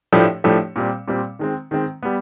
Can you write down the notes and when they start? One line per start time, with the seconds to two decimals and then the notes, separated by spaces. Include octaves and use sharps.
0.13 A2 F3 A3 D4 G4
0.44 A2 F3 A3 D4 G4
0.76 A#2 G3 C4
1.08 A#2 G3 C4
1.39 D#3 G#3 C4
1.71 D#3 G#3 C4
2.03 G3 B3